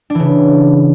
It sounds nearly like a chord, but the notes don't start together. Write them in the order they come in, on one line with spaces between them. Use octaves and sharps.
D4 E3 C#3